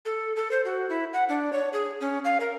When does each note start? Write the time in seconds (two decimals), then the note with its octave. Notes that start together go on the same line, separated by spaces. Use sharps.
0.05 A4
0.36 A4
0.51 C5
0.65 F#4
0.89 E4
1.13 F#5
1.29 D4
1.53 C#5
1.73 G#4
2.01 C#4
2.25 F5
2.40 A#4